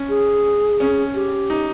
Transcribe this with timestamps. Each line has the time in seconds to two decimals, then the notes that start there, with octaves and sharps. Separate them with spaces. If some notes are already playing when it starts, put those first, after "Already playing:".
Already playing: C#4
0.09 G#4
0.80 C#4
1.15 G4
1.50 D#4